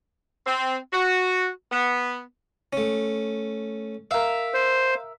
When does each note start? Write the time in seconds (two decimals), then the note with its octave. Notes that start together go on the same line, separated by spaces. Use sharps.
0.47 C4
0.93 F#4
1.72 B3
2.73 A3 C#4
4.11 A#4 E5 F5
4.54 C5